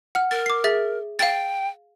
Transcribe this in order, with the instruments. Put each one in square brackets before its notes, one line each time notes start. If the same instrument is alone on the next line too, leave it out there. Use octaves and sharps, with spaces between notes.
[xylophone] F#5 F6
[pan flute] A#4 [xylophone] A6
[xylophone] D6 C7
G#4 E5 A6
[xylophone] F5 A6 [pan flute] G5